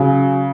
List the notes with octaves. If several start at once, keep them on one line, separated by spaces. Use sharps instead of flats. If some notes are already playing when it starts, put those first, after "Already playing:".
Already playing: C#3 F#3